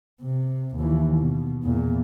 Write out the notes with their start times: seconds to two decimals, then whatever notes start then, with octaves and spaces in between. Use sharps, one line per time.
0.21 C3
0.76 D#2 E3
1.16 B2
1.63 E2 A#2